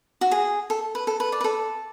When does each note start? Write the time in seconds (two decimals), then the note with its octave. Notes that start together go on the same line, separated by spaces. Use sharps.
0.21 F#4
0.32 G#4
0.70 A4
0.95 B4
1.07 A4
1.20 B4
1.32 D5
1.41 B4
1.44 A4